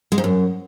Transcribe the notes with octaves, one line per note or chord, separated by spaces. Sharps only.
G#3
G#2
F#2